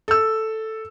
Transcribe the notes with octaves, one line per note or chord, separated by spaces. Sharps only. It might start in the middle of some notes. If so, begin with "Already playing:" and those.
A4 E6